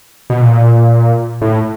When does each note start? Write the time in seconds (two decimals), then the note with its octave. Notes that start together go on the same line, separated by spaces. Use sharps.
0.30 B2
0.41 A#2
1.41 A2